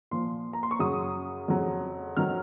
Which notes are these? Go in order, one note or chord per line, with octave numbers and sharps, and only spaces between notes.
A#2 F3 C6
A#5
C6
C#6
F#2 C#3 F#3 D#6
F2 C#3 F#3
F2 D#3 F#3 F6